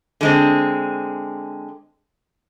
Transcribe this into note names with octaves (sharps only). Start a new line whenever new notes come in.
D3 G#3 C4